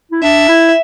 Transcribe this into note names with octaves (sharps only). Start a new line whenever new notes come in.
E4
D4 E5
E4